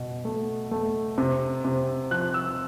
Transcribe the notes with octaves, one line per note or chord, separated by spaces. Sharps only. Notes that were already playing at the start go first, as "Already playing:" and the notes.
Already playing: B2
A3
A3
C3
C3
F3 F#6
E6